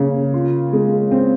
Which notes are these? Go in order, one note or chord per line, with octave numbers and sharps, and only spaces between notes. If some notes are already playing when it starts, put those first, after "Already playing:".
Already playing: C#3 A#3
F4
G#3
C4